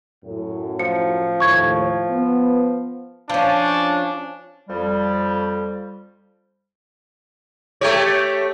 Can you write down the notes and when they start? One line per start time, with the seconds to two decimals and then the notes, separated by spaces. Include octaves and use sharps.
0.24 F#2 A2
0.79 F3 C#7
1.40 D#2 A2 C#6 G#6
2.09 B3
3.30 F3 C#4 D4
4.70 F2 G3
7.81 A3 G4 C#5